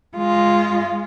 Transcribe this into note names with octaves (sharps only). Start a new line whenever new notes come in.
G#3 F4